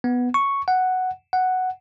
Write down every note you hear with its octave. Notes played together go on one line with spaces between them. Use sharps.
B3
C#6
F#5
F#5